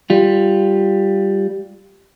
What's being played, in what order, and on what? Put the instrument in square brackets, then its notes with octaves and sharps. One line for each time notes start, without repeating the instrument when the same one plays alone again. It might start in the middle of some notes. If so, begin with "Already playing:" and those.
[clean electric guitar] G3 F4